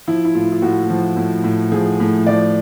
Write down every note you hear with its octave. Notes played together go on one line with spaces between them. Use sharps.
F3 E4
E4
A2 F4
F4
A2 F#4
F3
A2
A2
F3 G#4
A2
F3 D5